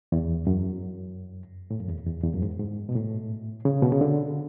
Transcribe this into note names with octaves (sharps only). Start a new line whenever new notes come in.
E2
F#2
A2
F#2
E2
E2
E2
F#2
G#2
G#2
B2
A2
C#3
B2
C#3
D3